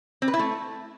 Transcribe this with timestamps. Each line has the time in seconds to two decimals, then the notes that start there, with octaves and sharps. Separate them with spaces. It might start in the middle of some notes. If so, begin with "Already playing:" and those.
0.22 C4
0.28 B4
0.34 E4
0.39 A3